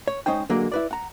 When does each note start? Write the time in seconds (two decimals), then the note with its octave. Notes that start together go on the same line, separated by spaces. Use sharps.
0.08 C#5
0.26 G#3 C#4 D#4 C5 G5
0.50 D3 F#3 G#3 A#3
0.72 E4 B4 D5
0.91 F#5 A#5